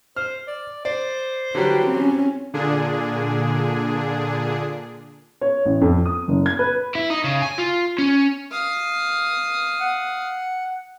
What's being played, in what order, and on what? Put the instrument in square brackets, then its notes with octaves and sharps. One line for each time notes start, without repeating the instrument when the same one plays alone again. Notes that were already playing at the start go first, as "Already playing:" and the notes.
[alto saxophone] C5 [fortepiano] F6
[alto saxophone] D5
[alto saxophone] C5 [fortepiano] D5
[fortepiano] D3 F#3 G3 [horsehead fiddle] B4 G5
[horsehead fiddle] C4 C#4
[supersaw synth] A#2 D3 D4 G#4
[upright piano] C#5
A1
F2
D#6
F#1
G#6
B4
[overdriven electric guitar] E4
D#4
C#3
G#5
F4
C#4
[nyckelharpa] F5 D#6
[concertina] F#5